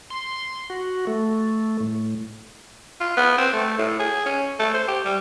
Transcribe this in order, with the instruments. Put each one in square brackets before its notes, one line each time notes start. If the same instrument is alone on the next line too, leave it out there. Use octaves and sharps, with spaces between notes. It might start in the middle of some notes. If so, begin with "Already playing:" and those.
[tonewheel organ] C6
F#4
A3
A2
[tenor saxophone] F4
B3
C4
A3
A2
G#4
C#4
A3
C5
G4
G3